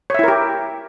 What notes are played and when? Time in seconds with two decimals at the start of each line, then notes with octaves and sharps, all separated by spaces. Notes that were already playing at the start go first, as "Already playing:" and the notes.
0.10 C#5
0.14 E5
0.19 E4
0.24 A#4
0.28 G4